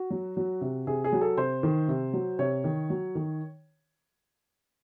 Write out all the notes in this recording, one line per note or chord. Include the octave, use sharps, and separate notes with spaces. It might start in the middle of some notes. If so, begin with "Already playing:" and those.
Already playing: F#4
F#3
F#3
C3
C3 G#4
G#4
F#3
A4
C3 C5
D#3
C3
F#3
C3 C#5
D#3
F#3
D#3